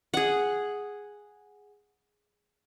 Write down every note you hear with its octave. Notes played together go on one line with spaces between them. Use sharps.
G#4 F#5